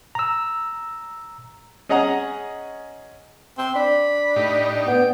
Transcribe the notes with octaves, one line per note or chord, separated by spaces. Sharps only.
A#5 E6
C#4 G#4 D#5 F#5 G#5 A#5
C4
D4 B5
A2 D#4 G4
B3 G5